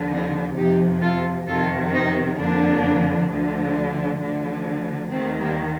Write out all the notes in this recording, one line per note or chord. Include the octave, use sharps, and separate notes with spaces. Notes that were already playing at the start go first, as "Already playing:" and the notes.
Already playing: D#2 D3 F3
C4 D#4
F2 C3 F3 D#4 G4
F4 A4
F2 C3 D#3 F4 A4
C4 D#4
F2 D3 F3 A#3 D4
D2 D3 F3
D2 D3 F3
D#2 D#3 A3 C4
G3 A#3